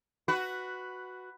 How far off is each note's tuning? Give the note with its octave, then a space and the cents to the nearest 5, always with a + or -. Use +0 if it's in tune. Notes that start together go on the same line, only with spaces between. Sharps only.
F#4 +0 B4 +5